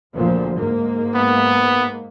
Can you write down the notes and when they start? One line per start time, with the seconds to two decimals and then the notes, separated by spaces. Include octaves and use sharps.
0.16 D2 A#2 F3
0.58 G#2 A#3
1.15 B3